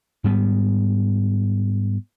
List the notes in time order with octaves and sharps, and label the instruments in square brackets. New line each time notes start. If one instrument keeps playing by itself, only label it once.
[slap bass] G#2 G3 B3